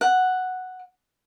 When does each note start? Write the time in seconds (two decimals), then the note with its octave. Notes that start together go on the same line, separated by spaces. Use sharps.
0.01 F#5